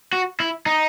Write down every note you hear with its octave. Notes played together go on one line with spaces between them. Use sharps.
F#4
E4
D#4